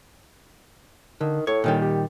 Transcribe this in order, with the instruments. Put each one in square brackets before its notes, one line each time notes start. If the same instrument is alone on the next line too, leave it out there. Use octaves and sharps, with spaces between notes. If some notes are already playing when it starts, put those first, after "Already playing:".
[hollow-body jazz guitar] D3 [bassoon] D#3
[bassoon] A2 [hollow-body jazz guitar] C#5
[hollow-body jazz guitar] A#2 D#3 G3
[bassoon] G4